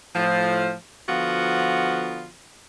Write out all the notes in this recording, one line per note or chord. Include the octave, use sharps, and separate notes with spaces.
A2 F3
D3 F3 B3 F4 F#4